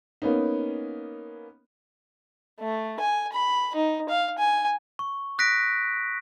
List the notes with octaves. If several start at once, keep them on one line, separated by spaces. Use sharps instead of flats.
A#3 B3 C#4 D#4
A3
G#5
B5
D#4
F5
G#5
C#6
D#6 F#6 A#6 B6 D7